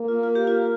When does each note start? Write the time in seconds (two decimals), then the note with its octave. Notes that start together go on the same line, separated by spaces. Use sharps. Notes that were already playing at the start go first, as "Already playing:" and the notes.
Already playing: A#3
0.08 F4
0.23 F4
0.35 G4
0.47 F4